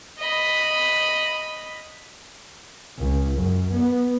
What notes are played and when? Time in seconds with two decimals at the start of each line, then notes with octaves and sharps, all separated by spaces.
0.19 D#5 B5
2.98 C#2
3.37 F#2
3.71 B3